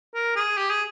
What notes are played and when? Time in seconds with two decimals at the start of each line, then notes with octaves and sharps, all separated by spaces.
0.15 A#4
0.36 G#4
0.57 G4
0.70 G#4